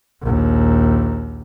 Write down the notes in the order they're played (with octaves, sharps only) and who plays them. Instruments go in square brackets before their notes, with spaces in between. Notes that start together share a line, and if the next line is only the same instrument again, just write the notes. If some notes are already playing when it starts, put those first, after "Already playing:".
[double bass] A#1 D#2